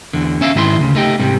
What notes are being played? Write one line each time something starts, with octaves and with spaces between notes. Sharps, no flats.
E2 D3
C#4 E5 F5
G#2 D#3 E4 A#4 C6
D2 C#3
A3 D#4 G4
G#2 C3 G3